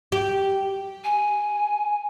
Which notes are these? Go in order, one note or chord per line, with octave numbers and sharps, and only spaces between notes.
G4
G#5